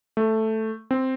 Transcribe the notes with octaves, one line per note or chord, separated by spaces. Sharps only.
A3
C4